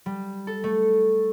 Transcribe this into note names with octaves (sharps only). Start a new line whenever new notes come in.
G3
A4
A3